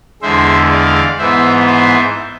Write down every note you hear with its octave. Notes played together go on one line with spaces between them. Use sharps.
E2 D3 G#3 C5 E5
D5 F5
G#2 E3 B3 C5 E5
C5 E5